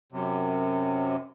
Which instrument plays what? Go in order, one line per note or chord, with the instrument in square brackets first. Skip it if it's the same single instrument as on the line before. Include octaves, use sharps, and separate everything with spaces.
[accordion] F#2 C3